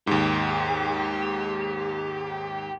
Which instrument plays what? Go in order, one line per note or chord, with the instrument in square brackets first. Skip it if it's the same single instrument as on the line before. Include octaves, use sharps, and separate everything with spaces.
[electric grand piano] D#2 G#2 [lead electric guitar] G4